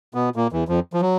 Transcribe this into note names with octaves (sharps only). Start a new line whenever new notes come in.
B2 B3
A#2 A#3
E2 E3
F2 F3
F3
F#3